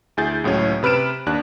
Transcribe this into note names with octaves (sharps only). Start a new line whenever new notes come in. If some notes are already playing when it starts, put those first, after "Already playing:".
D2 E4 G#4 G6 A6
C#2 A2 F#3 C#4
C3 B4 F6 D7 E7
D#2 D4 F#6